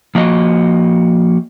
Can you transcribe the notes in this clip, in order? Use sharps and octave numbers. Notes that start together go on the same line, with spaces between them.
F3 A#3 F#4 D#5